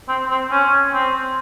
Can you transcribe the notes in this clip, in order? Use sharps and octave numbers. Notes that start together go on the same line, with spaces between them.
C4
C4
C#4
C4